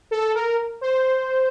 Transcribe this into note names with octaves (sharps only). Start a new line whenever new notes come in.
A4
A#4
C5